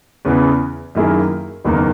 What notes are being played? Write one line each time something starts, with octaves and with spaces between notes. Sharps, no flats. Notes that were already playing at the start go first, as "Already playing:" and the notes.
E2 C#3 E3 B3
F#2 D#3 A#3 E4 G#4
F#1 E2 D#3 A#3 D#4